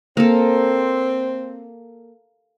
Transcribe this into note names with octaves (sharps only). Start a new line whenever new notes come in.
A#3 C4 A4